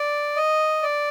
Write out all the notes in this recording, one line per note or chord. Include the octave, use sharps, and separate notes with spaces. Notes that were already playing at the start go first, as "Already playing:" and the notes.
Already playing: D5
D#5
D5